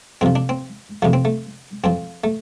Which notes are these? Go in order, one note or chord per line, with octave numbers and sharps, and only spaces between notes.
F2 C3 F3 C4
D4
C4
F2 C3 F3 A3
C4
A3
F2 F3 C4
A3